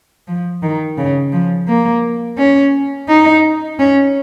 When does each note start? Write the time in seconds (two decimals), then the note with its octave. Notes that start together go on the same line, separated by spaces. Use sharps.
0.28 F3
0.63 D#3
0.98 C#3
1.33 F3
1.69 A#3
2.38 C#4
3.09 D#4
3.79 C#4